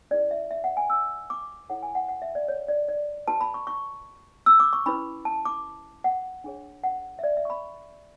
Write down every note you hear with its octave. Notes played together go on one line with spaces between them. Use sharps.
C#4 E4 G#4 B4 D5
E5
E5
F#5
G#5
E6
D6
E4 A4 C#5 F#5
G#5
F#5
F#5
E5
D5
C#5
D5
D5
F#4 B4 A5
B5
C#6
C#6
E6
D6
C#6
C#4 E4 B4 B5
A5
D6
F#5
D4 G#4 C#5
F#5
E5
D5
E5
C#6
B5